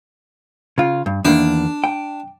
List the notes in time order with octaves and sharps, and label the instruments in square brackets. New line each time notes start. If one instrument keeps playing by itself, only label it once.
[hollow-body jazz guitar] C#3 F4
G2
[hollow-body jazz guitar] E2 D#3 A#3 [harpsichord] D4
[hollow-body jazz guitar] G5